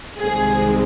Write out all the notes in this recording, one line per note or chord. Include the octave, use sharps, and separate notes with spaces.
C2 C3 D#3 G#3 C4 G#4